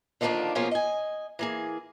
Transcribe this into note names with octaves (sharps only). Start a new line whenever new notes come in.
D3 D#3 F3 A3 A#3 D4
B2 F3 A#3 C#4 F4 G#4
D#5 G#5
E3 A#3 G#4